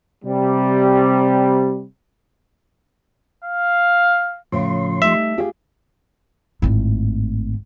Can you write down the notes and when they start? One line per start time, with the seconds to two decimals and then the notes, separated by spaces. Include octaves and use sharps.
0.24 C3 G3
3.44 F5
4.52 A2 C#3 F3 C6
5.02 G3 A3 D#4 E5
5.38 F4 G4 G#4
6.62 G#1 A2